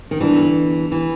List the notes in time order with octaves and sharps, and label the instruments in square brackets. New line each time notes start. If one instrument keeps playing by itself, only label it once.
[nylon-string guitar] D#3
[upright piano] D3 G3 B3 D4 [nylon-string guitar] E3
[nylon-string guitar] E3